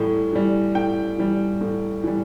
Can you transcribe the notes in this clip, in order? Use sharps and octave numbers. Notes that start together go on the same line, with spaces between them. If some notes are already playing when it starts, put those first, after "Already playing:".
Already playing: A2 E3 G3
E3 G3
A2 G5
E3 G3
A2
E3 G3